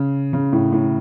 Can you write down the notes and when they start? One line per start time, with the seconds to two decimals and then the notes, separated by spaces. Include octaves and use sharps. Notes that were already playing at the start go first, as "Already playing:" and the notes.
Already playing: C#3
0.33 C#3
0.52 A2
0.72 A2